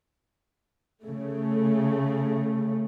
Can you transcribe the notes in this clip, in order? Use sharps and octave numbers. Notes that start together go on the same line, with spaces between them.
C#3 A3